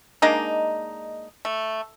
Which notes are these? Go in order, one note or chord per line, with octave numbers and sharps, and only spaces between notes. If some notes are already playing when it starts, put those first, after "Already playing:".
G#3 A#3 D4 D#4
A3